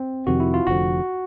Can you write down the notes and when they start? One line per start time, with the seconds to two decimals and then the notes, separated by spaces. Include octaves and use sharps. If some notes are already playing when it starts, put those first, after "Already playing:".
Already playing: C4
0.27 F2 C3 D#3 F#4
0.40 E4
0.54 F4
0.67 F1 F2 D3 F3 F#4